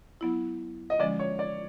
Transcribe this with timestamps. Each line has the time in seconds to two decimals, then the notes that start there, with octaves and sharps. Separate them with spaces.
0.21 F#3 B3 E4
0.90 D#5
0.99 D3 F3 G#3 C#4 D5
1.19 C#5
1.39 D5